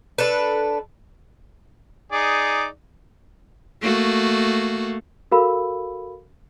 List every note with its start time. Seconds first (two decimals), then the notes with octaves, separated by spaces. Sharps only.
0.18 D4 A4 B4
2.12 D#4 G#4 D5
3.82 A3 A#3 F#4
5.32 F#4 A4 A#4 F5 B5 E6